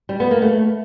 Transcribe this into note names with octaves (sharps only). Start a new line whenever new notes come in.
G3
B3
A#3
A3